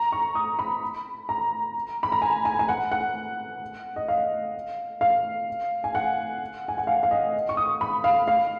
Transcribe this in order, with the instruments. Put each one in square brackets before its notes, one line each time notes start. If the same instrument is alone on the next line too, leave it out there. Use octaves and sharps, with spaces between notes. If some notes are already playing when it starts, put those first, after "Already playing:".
Already playing: [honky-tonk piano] A#5
C#6
D#6
B5
A#5
B5
A#5
G#5
G#5
G#5
F#5
F#5
D#5
F5
F5
G#5
F#5
G#5
F#5
F5
F5
D#5
C#6
D#6
B5
F5
F5